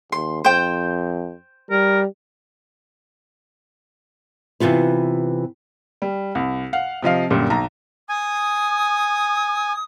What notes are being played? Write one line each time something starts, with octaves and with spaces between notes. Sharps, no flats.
D#2 C6
F2 C5 G5
G3 A#4
C3 E3 B3 F4 B4
G3
C2
F5 F#5
C3 F3 D#5 F5
F#2 A#2 D3 G3
B1 A#5
G#5 D#6